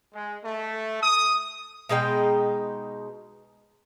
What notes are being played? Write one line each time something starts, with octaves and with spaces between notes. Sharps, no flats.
G#3
A3
D#6
B2 G#3 D#4 G5